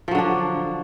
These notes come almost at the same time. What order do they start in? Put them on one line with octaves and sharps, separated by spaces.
F3 F#3 D3 D4